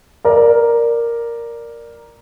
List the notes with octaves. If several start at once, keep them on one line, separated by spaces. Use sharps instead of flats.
A#4 D5